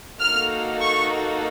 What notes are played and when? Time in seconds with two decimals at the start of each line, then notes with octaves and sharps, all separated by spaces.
0.19 A#3 D#4 F#4 A4 F6
0.81 C#6